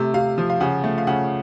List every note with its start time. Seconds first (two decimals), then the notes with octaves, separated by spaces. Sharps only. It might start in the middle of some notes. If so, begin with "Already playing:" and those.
Already playing: C3 A3
0.14 C3 F5
0.38 F3
0.50 F5
0.60 C#3 F#5
0.84 A3
0.98 F5
1.07 C#3 F#5